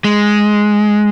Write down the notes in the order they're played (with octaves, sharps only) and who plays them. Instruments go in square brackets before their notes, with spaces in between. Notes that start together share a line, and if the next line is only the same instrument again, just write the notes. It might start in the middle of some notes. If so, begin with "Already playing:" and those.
[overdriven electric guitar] G#3